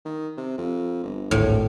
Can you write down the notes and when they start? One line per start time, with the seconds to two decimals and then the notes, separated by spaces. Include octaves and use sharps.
0.05 D#3
0.37 C3
0.58 F2
1.03 G1
1.31 G#1 D2 A2